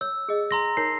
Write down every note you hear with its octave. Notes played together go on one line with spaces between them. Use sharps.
C#5 E6
G#4 D#5
A#5 C6 A#6
D#4 A#4 C#5 C7